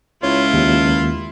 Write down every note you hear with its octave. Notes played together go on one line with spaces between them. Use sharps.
C#2 E4 F4 C#5
D#2